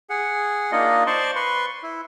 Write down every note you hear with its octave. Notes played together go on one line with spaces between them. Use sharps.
G#4 F#5
A#3 D4 D#4 F4 D#5
C5 D5 A5 C6 C#6
B4 C6 C#6
E4